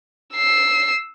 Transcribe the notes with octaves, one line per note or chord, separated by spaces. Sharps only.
E6 C7